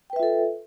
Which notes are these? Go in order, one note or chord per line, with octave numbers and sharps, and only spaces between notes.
F4 A4 B4 E5 G5